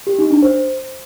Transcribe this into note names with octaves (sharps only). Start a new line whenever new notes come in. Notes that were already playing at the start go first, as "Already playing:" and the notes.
G4
D#4
D4
C5